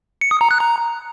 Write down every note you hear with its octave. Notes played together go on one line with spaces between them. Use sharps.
C#7
D#6
A#5
F#6
A#5